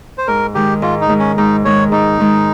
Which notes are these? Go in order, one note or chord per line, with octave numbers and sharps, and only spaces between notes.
C5
G#2 A#4
D#3 G#3 G4
G#2 F4
D#4
D#3 G#3
C#4
G#2 D#4
D#3 G#3 C#5
G#2 D#4
D#3 G#3